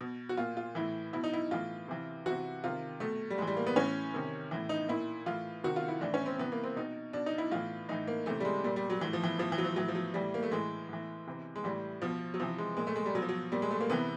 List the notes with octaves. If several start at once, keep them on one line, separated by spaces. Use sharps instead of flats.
B2
F#4
A#2 F4
F4
A2 E3 E4
B2 E4
D#4
E4
A2 E3 F4
C3 E3
C3 E3 F#4
C3 D#3 F4
B2 A3
G3
A2 E3 G#3
G3
A#3
B3
A2 E3 C#4
C3 D#3
A2 E3
D#4
A#2 E4
A2 E3 F4
C3 D#3 F#4
F4
E4
A2 E3 D4
C#4
C4
C3 E3 B3
A#3
C4
B2 D#4
B2 D4
D#4
E4
A2 E3 F4
A2 E3 D#4
A#3
C3 E3 A3
G3
G#3
A#2 G3
G3
F#3
A2 E3
F3
E3
A2 E3 F3
E3
F#3
F3
A2 E3 F#3
F3
F#3
A2 E3 G3
A#3
A3
A2 E3 G#3
A2 E3
C3 E3
G#3
A2 E3 G3
B2 F3
F#3
C3 E3 F3
G#3
A#2 G#3
A3
G#3
G3
B2 F#3
F3
F#3
A#2 G3
G#3
A3
A#3
C3 E3 B3